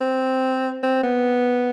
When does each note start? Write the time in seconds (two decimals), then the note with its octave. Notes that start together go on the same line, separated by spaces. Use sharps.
0.01 C4
0.83 C4
1.03 B3